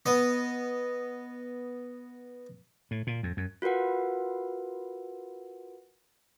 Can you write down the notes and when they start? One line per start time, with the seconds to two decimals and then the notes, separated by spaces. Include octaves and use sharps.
0.06 B3 D#5
2.91 A2
3.07 A#2
3.23 F2
3.37 F#2
3.62 F4 F#4 A#4 B4 F#5